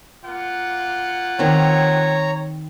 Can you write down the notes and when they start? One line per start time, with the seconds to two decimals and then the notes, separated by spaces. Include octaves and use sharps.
0.24 A#3 F4 F#5
1.39 D#3 C4 C#5 A#5